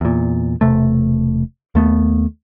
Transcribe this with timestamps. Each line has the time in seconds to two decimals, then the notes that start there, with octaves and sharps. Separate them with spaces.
0.01 E2 A#2
0.61 E1 C3 A3
1.75 D#2 A3 B3